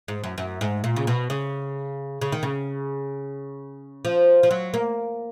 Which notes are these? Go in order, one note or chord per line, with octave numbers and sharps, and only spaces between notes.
G#2
F#2
F#2
G#2
A#2
C#3
B2
C#3
C#3
D#3
C#3
F3
F3
F#3
A#3